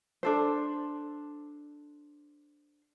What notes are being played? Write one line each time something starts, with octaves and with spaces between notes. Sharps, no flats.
D4 A4 C5